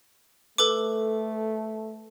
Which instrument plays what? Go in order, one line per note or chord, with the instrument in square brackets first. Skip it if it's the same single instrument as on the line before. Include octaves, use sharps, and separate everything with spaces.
[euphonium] A3 [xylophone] A4 B4 D6